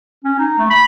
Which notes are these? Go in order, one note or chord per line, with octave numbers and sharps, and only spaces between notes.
C#4
D#4
A3
B5